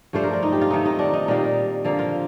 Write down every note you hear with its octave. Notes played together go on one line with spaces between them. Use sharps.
G2 F3 A3 D4 C5
A#4
D4
D#4
G4
F4
D#3 A3 C4 D#4
D#4
D4
D#4
A#2 G3 A#3 D#4
D3 F3 A#3
F4